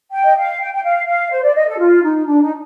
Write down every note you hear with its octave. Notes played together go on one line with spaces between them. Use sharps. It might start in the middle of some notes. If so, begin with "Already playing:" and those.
G5
D#5
F5
G5
G5
F5
F5
C5
D5
D#5
A4
F4
D#4
D4
D#4